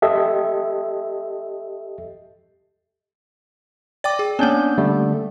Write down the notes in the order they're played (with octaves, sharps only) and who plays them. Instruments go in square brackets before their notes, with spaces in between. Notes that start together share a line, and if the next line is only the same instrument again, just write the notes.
[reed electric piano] G4 A4 D#5 E5
[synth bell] D5 G5 D6 [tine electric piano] A6
[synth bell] G#4
[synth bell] A#3 B3 [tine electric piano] C#4 D4 G6
[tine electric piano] D3 G3 A3